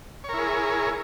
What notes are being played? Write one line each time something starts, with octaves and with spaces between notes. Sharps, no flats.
E4 G#4 A#4 C#5